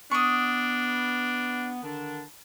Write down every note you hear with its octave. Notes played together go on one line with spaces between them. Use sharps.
B3 D4 C#6 D#6
D3 D#3 D4